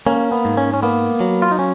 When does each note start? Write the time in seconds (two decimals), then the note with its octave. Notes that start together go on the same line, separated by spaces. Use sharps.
0.07 A#3 C#4
0.32 B3
0.45 G#2
0.57 C#4
0.74 C#4
0.82 A#3 B3
1.20 F#3
1.42 F4
1.51 D#4
1.59 C#4